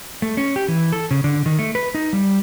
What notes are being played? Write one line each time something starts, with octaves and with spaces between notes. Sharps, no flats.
A3
C#4
G4
E3
A4
C#3
D3
D#3
A3
B4
D#4
G3